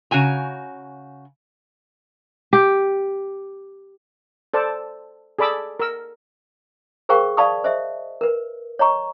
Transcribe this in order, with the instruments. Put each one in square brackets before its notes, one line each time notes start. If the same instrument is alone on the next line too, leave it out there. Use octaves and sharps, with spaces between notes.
[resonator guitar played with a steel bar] C#3 F#4 G#5 A#5
[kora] G4
[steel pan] A4 C5 D5 A5
G#4 A4 D5 B5 D6 E6
A#4 E6
[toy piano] G#4 A#4 C5 F5 G5 C#6
D5 F5 A5 B5 C#6 D#6
C5 D#5 E5
A#4 B4
C#5 D#5 A#5 C#6